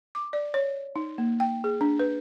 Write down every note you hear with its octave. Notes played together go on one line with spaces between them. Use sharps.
D6
D5
C#5
D#4
A#3
G5
G#4
D4
B4